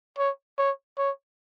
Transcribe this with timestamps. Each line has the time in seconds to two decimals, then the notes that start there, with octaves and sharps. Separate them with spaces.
0.18 C#5
0.59 C#5
0.98 C#5